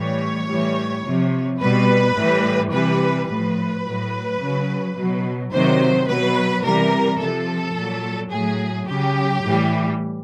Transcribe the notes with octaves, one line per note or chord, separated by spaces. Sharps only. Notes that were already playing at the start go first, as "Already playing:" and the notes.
Already playing: A2 E3 G3 C#5
A2 E3 G3
C3 F3
B2 G3 B4
A2 E3 G3
C3 E3 G3 B4
A2 F3 B4
A2 F#3
C#3 F#3
B2 F#3
C3 D#3 F#3 C5
B2 F#3 B4
C3 E3 G3 A#4
C3 F3 A4
A#2 F#3
A2 F#3 G#4
C#3 F#3 G4
A2 E3 G3